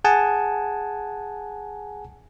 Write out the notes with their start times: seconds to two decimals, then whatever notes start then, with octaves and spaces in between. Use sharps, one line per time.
0.04 G#4 F#5 G#5 A5